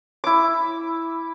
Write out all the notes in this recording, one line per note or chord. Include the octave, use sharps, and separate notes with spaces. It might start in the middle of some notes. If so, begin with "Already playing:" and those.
E4 D6